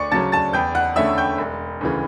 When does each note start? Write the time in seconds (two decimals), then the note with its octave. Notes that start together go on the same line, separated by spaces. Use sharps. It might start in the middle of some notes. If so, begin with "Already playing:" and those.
Already playing: D2 D5 C#6 D6 C#7
0.12 C#3 F#3 C#4 A5 A6
0.32 A5 A6
0.53 E2 G5 G6
0.75 F#5 F#6
0.96 D3 A3 C#4 E5 E6
1.18 G5 G6
1.38 E1
1.81 D2 C#3 E3